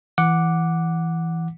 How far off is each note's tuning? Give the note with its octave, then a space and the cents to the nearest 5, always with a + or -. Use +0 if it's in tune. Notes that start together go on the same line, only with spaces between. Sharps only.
E3 +0 F#5 -5 D6 +0